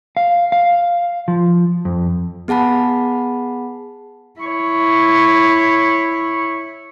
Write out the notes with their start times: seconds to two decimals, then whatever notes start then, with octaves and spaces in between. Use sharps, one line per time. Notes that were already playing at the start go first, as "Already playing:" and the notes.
0.17 F5
0.52 F5
1.28 F3
1.85 F2
2.48 B3 G#4 F#5 A5 B5
4.40 E4 C#5